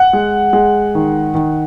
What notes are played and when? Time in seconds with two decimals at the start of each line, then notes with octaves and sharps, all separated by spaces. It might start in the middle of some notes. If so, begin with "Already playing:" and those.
Already playing: F#5
0.13 G#3
0.53 G#3
0.95 D#3
1.35 D#3